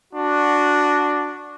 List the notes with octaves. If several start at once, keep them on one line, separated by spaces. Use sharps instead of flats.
D4 F#4